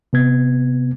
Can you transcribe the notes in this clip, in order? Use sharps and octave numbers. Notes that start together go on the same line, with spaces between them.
C3 B3 G#6